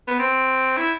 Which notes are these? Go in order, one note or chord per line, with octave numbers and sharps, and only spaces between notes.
B3
C4
E4